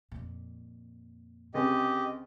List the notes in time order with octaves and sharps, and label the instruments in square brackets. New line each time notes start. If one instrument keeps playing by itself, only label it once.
[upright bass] F2 A#2
[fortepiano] C#2 C3 G#3 [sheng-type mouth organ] G4 D#5